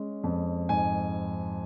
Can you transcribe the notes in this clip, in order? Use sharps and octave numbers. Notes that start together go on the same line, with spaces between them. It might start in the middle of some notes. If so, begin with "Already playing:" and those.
Already playing: G#3 C#4
F2
G#2 G#5